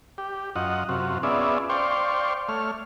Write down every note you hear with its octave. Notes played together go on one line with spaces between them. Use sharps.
G4
F#2 F4 D#5 F#5
F#2 C3 F4 F#4
B3 C#4 F4 G#4 D5 E5
C5 D5 F5 G5 C6 C#6
A3 C#5 F6